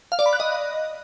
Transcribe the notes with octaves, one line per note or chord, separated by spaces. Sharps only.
F5
D5
B5
F#6
D#5